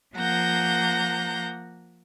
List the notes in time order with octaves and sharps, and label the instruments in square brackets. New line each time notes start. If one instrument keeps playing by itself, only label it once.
[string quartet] F3 A#3 F#5 A#5 G6